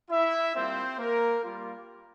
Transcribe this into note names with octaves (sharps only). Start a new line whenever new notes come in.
E4 E5
G3 A#3 C4 F4 C5
A#3 A#4
G3 A#3 F4